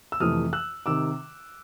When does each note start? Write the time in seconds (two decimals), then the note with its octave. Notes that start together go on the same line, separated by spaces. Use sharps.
0.12 E6
0.20 F2 C3 E3 A3 D#6 F6
0.53 E6 F#6
0.86 C3 D#3 D6 E6